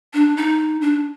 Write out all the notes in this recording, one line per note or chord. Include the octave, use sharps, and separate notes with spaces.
D4
D#4
D4